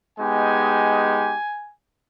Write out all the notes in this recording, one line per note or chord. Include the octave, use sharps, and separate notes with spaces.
G#3 B3 D#4 G4 G#5